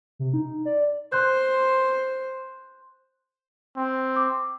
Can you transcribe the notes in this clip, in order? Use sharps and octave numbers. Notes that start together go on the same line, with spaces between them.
C3
D#4
D5
C5 C6 F#6 G6
C4
D6